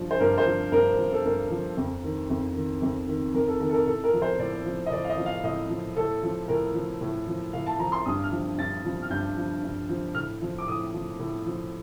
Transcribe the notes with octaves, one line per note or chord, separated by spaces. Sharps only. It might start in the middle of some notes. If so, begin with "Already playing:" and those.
Already playing: G2 F3
C5
G2 A#4
C5
F3
G2 A#4
F3
A4
G2 A#4
F3
F2
D#3
F2
D#3
F2
D#3
F2 A#4
A4
D#3 A#4
A4
A#4
A2 A4
A#4
F3
C5
A2 D5
F3
D#5
A2 D5
F5
D#5
F3
F5
A2 D#5
F3
A2 A4
F3
A2 A#4
F3
A2
F3
A2 F5
A5
F3 A#5
C6
G2 D#6
F6
F3
G2 A6
F3
F6
G2 G6
F3
G2
F3
A2 F6
F3
D6
A2 D#6
F3
A2
F3